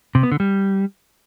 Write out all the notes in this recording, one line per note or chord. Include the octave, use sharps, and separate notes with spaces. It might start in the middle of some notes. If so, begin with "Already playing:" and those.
C3
B3
D3
G3